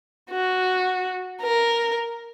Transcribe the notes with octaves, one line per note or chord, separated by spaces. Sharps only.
F#4
A#4